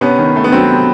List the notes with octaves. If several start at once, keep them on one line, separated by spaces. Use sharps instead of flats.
C3 B3 C#4
D#3
A3
B3
F#3 C4
C3